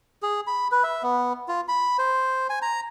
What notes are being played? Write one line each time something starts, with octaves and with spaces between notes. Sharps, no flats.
G#4
B5
B4
E5
B3
F4
B5
C5
G#5
A#5